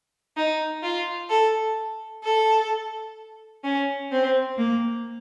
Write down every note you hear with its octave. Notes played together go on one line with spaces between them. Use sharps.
D#4
F4
A4
A4
C#4
C4
A#3